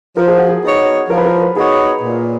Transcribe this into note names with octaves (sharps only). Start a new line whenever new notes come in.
F3 A#4
G#4
F#4
G#4
B3 D#4 F#4 C#5
F3 A#4
B4
A#4
B3 D#4 F#4 G#4 C#5
A#2